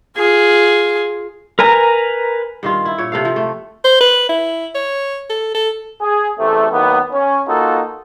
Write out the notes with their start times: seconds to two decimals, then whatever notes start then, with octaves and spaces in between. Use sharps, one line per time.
0.17 F4 G#4
1.59 A#4 B4 G#5 A#5
2.63 G2 D#3 F4
2.85 E4
2.98 A#2 C#5
3.12 C3 A4 F5
3.25 F3
3.36 A3
3.85 C5
4.01 B4
4.29 E4
4.75 C#5
5.30 A4
5.55 A4
6.01 G#4
6.39 A1 E2 C3 A3
6.72 D#3 F#3 A#3 B3
7.12 C#4
7.48 A#3 D#4 F4 F#4 A4